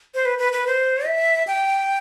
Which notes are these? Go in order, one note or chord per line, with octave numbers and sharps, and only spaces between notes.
C5
B4
B4
B4
C5
E5
G5